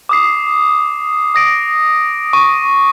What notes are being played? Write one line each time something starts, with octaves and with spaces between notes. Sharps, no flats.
D6 D#6 C7
D#6 A#6 D7
C#6